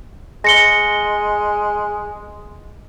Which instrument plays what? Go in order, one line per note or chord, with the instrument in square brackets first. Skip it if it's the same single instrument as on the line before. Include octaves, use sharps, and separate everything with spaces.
[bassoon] G#3 [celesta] A#6 C#7 G7